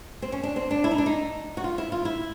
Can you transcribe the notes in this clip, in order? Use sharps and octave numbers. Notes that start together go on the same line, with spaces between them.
C4
C#4
D4
C4
D4
E4
D#4
D4
D#4
F#4
F4
E4
F4
E4